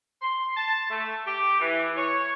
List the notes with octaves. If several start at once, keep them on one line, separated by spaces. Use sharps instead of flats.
C6
A5
A3
G4
E3
C#5